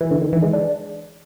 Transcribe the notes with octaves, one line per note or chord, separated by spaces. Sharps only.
E3
D3
D#3
E3
G#3
D4